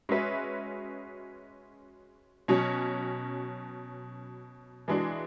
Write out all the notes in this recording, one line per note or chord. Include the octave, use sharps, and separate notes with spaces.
G#3 C#4 F#4 B4 E5
B2 F#3 C#4 F#4
E3 G#3 D4 F#4